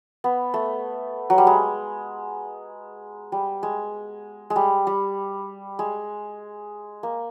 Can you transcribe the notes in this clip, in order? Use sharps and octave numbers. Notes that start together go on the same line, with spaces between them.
B3
A3
F#3
G3
G#3
G3
G#3
G#3
G3
G3
G#3
A#3